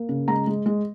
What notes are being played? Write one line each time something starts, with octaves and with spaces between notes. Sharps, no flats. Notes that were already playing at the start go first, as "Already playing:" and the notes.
Already playing: A#3
C#3
G#3 A#5
G#3
G#3